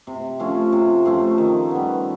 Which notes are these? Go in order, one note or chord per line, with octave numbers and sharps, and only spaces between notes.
C3
F3 A3 C#4
C3
F3 A3 C#4
D#3
G3 B3